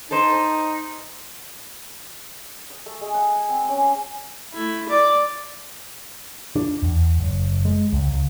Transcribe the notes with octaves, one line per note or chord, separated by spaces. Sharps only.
D#4 A4 C5
D#6
A3
G#3
F#5
G#5
C4
C#4
F5
A3 E4
D5 D6
D4
E2
F#1
G#3
C#2
C#2